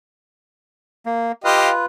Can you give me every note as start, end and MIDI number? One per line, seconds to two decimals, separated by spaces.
1.06 1.32 58
1.44 1.86 65
1.44 1.70 67
1.44 1.86 71
1.44 1.70 75
1.44 1.70 77